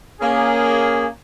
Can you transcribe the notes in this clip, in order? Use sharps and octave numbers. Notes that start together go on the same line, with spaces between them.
A#3 C#4 G#4